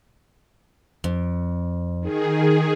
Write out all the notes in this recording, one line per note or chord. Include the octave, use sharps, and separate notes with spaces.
F2
D#3 G#4